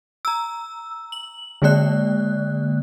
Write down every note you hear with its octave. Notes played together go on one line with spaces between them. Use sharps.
A#5 E6
F#7
D3 G#3 A#3 D5 F#6